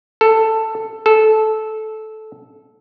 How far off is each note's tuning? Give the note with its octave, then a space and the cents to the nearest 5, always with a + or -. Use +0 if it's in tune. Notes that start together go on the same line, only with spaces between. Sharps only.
A4 +10
A4 -15